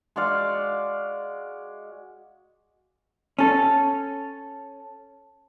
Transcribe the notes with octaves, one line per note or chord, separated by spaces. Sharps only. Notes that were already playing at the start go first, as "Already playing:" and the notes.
G#3 F#4 D5 F5
C#4 A4